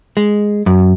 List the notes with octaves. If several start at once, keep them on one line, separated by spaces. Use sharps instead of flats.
G#3
F#2